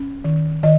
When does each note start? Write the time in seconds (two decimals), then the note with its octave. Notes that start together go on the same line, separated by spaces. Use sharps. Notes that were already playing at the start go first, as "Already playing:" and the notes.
Already playing: C#4
0.24 D#3
0.63 D#3 D#5